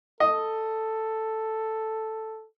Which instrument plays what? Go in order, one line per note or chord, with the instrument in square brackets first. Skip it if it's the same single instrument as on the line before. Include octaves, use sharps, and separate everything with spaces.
[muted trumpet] A4 [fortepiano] D#5